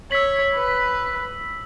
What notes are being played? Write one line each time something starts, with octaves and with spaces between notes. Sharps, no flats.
C#5 E6 B6 F#7
B4